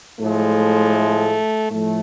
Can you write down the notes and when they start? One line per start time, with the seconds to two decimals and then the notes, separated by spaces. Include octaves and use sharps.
0.20 A2 F3 G#3 A3
1.71 A2 F3 A3